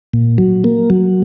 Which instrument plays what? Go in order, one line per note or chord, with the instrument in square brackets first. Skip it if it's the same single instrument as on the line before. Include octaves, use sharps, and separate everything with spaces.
[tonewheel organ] A#2
F#3
A#3
F#3